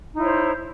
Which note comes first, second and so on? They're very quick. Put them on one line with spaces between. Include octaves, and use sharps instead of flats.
D#4 E4 C#5 C5